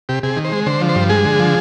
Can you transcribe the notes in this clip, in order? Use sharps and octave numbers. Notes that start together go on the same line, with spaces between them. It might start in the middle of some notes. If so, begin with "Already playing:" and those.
C3 G4
C3 G#4
D#3
C5
G#3
D3 C5
F3
C5
G2
G#3 G#4
D3
F3